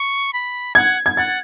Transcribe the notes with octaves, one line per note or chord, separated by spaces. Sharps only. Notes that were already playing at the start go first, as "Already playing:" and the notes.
Already playing: C#6
B5
F#5 G#6
G#6
F#5 A6